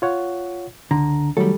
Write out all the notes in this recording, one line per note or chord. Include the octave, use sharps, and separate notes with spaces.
F4 C#5 F#5
C#2 D3 A#5
D#3 F#3 G3 A3 A4